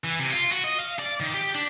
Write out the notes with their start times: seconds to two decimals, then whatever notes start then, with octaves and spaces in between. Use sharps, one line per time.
0.04 E3
0.20 C3
0.32 F4
0.52 F#4
0.64 D#5
0.80 F5
0.99 D5
1.20 D#3
1.34 G4
1.55 D4